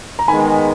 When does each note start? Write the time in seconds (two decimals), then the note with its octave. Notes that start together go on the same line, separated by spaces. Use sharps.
0.19 A#5
0.28 D#3 G#3 B3 G#5 B5